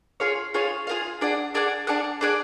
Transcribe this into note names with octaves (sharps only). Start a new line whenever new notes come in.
F4 G#4 C#5 F5
F4 G#4 C#5 F5
F4 G#4 C#5 F5
D4 G#4 D5 F#5
D4 G#4 D5 F#5
D4 G#4 D5 F#5
D4 G#4 D5 F#5